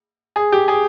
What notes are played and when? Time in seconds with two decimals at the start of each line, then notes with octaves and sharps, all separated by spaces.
0.36 G#4
0.52 G4
0.68 G#4